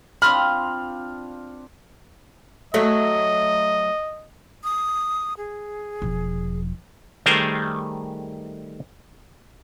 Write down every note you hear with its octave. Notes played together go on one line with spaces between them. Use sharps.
C4 D4 F4 B5 C6 D#6 F6
F#3 A3 D#5
D#6
G#4
E1 F3
D#3 G3 A3 G#4 A#4 C5